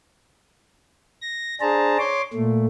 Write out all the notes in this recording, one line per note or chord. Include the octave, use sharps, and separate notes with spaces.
A#6
D4 G#4 C5 A5 A#5
C#5 C6 D6
A#2 A3